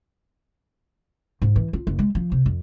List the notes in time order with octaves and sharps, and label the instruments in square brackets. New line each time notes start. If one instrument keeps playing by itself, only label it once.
[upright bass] G#2
E3
F4
F#1
G#3
F3
C3
F2